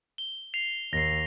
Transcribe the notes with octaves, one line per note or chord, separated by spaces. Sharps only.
G7
C7 F7
D#2 A#6 C7